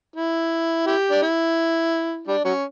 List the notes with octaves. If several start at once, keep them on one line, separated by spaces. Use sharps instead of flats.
E4
E4 G4
D4
E4
G3 D4
F#3 C#4